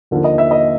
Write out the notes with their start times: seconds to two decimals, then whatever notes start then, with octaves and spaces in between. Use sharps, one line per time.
0.11 D#2 D3 F3 A#3
0.24 D#5
0.38 E5
0.51 D#5